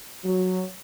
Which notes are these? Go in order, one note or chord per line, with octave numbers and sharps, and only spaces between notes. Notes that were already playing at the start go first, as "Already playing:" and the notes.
F#3